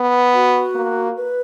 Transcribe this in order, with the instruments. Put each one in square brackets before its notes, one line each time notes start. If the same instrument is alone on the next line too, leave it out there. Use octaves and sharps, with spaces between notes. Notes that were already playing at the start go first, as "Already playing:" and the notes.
Already playing: [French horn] B3
[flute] F#4
[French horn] A#3
[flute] B4